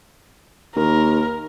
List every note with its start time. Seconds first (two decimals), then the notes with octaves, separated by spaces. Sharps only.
0.76 D#2 A#4